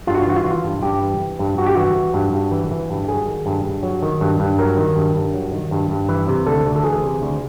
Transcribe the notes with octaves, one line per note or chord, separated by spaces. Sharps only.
G2 F4
F#4
F4
E3 F#4
F4
E3 F#4
F4
G2
G2 G4
E3
E3
G2
G2 F#4
G4
E3 F#4
E3
G2
G2
E3
E3
G2
F#3 G#4
D#3
G2
G2
F#3
D#3
G2
G2
F#3 A#4
D#3
G2
G2
F#3
D#3
G2
G2
E3 B4
C3
D2 A4
D2
A4
E3 G#4
C3
D2